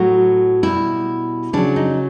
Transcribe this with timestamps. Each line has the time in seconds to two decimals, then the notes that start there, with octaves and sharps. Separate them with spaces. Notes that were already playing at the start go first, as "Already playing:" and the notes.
Already playing: A2 F#3 F#4
0.63 B2 G3 E4
1.53 C#3 F#3 D4
1.76 D#4